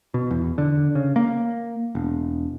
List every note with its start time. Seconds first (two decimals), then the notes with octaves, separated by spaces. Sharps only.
0.14 B2
0.30 E2
0.58 D3
0.95 C#3
1.16 A#3
1.95 E1